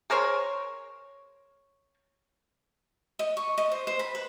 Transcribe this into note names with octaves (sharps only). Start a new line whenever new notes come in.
G#4 A#4 C5 C#5
D#5
C#6
D#5
C5
C5
B5
B4